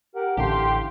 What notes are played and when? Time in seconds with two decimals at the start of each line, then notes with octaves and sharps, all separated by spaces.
0.15 G4 A#4 F#5
0.37 A1 A2 D3 G4 F5 C6